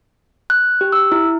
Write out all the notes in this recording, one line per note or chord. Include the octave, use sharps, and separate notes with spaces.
F#6
G4
E6
E4